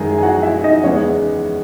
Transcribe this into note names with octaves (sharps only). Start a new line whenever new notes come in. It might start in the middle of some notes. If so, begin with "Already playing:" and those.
Already playing: F#2 D#3 G#3 G#4 G#5 A#5
G#5
F#4 F#5
E4 E5
D#4 D#5
E2 C#3 G#3 B3 C#4 D#4 C#5